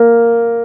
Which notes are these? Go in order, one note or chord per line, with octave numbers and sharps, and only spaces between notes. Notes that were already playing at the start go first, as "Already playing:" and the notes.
Already playing: A#3